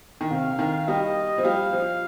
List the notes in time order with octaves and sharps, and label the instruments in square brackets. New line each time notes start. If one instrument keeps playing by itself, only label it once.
[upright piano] D#3
[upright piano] C3 [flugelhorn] F5
[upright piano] D#3
[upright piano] G3 [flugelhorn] D#5
[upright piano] F3
[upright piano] G3 [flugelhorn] F5
[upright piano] F3